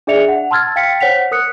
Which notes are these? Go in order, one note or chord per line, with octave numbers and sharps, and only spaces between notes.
D4 G#4 D5 E5 C#7 F7
F#5
A5 C6 E6 F6 G#6 A6
F5 G5 A6 B6 C#7
C5 C#5 F#5 B6 F7
A#4 D#6 F#6 C#7